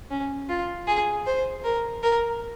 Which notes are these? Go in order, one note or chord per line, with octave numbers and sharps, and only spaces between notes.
C#4
F4
G#4
C5
A#4
A#4